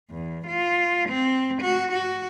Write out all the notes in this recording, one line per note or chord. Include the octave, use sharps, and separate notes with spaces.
E2
F4
C4
F#4
F#4